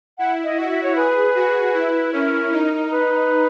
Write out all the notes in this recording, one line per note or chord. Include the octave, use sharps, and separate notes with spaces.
E4 F#5
D#5
F#4 D#5
E5
C#5
G#4 B4
F#4
E4
C#4 A#4
D#4
B4